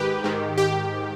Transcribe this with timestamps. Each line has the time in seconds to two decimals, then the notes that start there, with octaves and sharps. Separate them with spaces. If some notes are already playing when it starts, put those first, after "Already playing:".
Already playing: G#2 D#3 G4 B4
0.24 G#2 D#3
0.58 G4